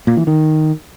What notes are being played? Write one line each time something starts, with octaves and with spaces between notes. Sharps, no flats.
A#2
E3
D#3